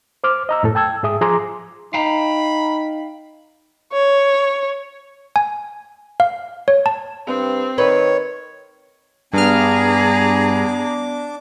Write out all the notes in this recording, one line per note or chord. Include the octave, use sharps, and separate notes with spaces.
C5 D6 F6
D#5 A#5 E6
F#2 A2 A4
G5 A5 E6 G#6
G#2 G#4 E5 D#6
F3 G#4 A#5 C6 D6
D#4 F5 G5 A#5 B5
C#5
G#5
F5
C#5
A5
G2 C4
D#3 B4 C#5
G2 B3 D4 G#4 A#5 D6 F6